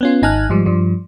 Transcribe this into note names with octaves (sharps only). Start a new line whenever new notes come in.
B3 C#4 F4
G#1 D#4 G#5 A5 F6 F#6
G#2 F3 G3
G2 F3 G3